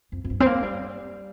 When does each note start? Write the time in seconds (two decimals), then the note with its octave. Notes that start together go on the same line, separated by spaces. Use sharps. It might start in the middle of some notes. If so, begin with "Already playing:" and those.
0.12 F2
0.24 F2
0.30 G2
0.40 C4
0.46 A#3
0.63 G3